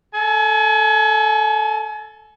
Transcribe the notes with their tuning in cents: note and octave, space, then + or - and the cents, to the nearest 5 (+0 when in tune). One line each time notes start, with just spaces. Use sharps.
A4 +0 G#5 +35